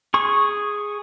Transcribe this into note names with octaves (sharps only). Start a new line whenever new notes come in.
G#4 C#6